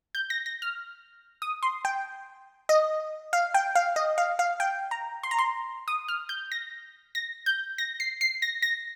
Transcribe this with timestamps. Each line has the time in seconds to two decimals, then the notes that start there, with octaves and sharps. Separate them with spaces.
0.15 G6
0.30 A#6
0.46 A#6
0.62 F6
1.42 D#6
1.63 C6
1.85 G5
2.69 D#5
3.33 F5
3.54 G5
3.75 F5
3.96 D#5
4.18 F5
4.39 F5
4.60 G5
4.91 A#5
5.23 C6
5.31 A#5
5.39 C6
5.88 D#6
6.08 F6
6.29 G6
6.52 A#6
7.15 A#6
7.46 G6
7.78 A#6
8.00 C7
8.21 C7
8.42 A#6
8.62 A#6